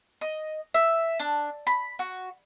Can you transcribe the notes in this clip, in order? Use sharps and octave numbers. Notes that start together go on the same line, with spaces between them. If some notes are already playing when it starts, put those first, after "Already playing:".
D#5
E5
D4
B5
F#4